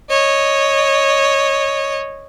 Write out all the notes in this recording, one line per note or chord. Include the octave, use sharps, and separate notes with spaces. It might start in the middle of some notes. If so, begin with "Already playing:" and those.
C#5 D#5